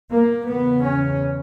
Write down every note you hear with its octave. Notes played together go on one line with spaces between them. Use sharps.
A#3
E2 C#3 B3
C#4